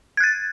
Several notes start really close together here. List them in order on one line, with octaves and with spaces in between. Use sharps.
G#6 F#6 A6